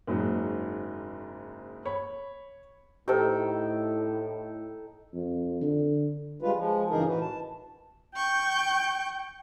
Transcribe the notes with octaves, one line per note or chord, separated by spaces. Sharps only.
F#1 G#2 F#3
C#5 B5
A2 D#4 G4 A4 C5 G5
F2
D3
G3 G#3 F4 B4
F3 G#3
G2 C#3 E3 D#4 G#4 A#4
A2 E3 F#4 B4
A5
G5 C#6 G6